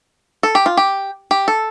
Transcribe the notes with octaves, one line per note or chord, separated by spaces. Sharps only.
A4
G4
F4
G4
G4
A4